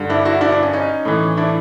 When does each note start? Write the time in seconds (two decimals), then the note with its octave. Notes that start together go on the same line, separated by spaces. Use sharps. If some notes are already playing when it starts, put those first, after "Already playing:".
Already playing: G2 D3
0.10 D4 E4
0.25 E4 F#4
0.41 D4 E4
0.52 D4
0.63 C#4
0.73 C#4 D#4
1.05 A2 E3
1.37 D4 E4